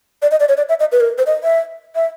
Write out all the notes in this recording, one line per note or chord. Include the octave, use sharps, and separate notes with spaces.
D5
D#5
D5
C#5
D5
E5
D#5
B4
A#4
C5
D#5
E5
E5